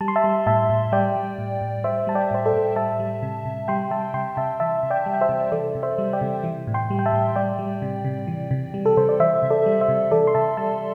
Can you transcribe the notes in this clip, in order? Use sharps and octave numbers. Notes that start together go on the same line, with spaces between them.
G3 A5
C6
E5 A5
G3
A2 E5 A5
A2
G3 D5 G5
G3
A2
A2
G3 C5 E5
G3 A5
D5 G5
A2 C5
A4 D5
A2
G3 E5 A5
G3
C3
C3
G3 G5 C6
G3 E5 A5
C3 G5 C6
C3 E5 A5
E3 E5 A5
C3
D5 G5
G3
G5
C5 E5
C3
E3 A4 D5
C3
C5 E5
G3
D5 G5
C3
E3
A2
G5 C6
G3
G5
E5 A5
A2
G3 D5 G5
G3
C3
C3
E3
C3
G3
A4
C3 C5
D5
E3 C5 E5
C3
A4 D5
G3
C5 E5
C3
E3 A4 D5
C6
C3 E5 A5
G3 E5 A5